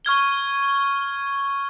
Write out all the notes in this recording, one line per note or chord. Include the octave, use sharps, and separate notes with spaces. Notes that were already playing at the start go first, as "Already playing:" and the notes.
C#6 F6 G#6 G7